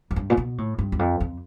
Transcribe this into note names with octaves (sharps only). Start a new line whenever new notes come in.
F#2
G2
A#2
B2
A2
G2
E2
F2
F2